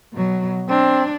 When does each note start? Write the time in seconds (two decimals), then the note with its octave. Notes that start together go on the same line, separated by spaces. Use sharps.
0.13 B2 F#3
0.69 C4 D4